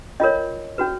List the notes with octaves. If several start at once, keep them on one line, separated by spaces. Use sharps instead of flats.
C#4 F4 A#4 C#5 D#5
C#4 F#4 B4